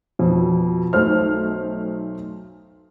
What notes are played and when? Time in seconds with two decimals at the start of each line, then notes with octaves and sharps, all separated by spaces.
0.19 F2 B2
0.93 B1 A3 D#4 C5 F6